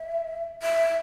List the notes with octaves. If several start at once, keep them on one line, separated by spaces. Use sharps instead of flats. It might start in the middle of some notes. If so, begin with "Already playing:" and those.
Already playing: E5
E5